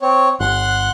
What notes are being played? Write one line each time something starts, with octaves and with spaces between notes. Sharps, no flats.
C4 C#5
G1 F#5 C6 F#6